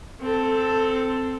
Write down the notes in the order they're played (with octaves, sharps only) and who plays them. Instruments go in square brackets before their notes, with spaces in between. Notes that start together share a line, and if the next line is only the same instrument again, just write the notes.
[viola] C4 A4